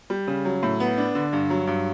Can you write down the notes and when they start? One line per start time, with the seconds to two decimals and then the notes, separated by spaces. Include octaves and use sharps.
0.10 G3
0.27 C#3
0.45 F#3
0.63 A2
0.80 B3
0.98 D4
1.15 D3
1.33 G2
1.50 F#3
1.67 G2